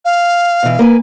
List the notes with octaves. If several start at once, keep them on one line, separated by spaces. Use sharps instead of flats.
F5
B2 E3
A#3 B4 G#5